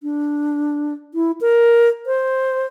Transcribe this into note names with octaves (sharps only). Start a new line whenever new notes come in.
D4
E4
A#4
C5